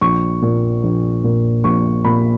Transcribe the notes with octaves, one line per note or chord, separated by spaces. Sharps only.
A#1 C#6
A#2
A#1
A#2
A#1 C#6
A#2 B5